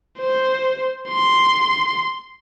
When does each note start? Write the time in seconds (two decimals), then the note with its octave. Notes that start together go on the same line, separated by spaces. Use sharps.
0.19 C5
1.10 C6